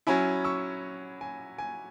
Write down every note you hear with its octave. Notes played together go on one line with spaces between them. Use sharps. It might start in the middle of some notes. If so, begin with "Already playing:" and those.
F#3 C#4 E4 G#5 B5
C#6 E6
G#5
G#5